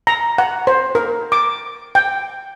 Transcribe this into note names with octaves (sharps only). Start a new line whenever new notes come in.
A#5
F#5
C5
A#4
D6
G5